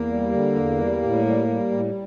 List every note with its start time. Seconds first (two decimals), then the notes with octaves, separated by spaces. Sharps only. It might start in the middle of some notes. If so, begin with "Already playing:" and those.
Already playing: E2 A#3
0.09 G3
0.32 D3
0.55 E2
0.78 G3
1.02 A2
1.25 G3
1.48 G3
1.71 A2